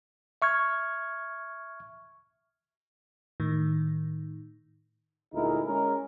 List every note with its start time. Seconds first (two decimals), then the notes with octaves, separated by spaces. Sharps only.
0.42 E5 C#6 F6 G#6
3.40 A2 D#3
5.33 D2 A#2 G#3 D#4 E4 A#4
5.67 G#3 C#4 G#4 A#4